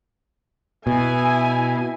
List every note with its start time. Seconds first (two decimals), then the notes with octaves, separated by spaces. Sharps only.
0.87 B2 E4 G#5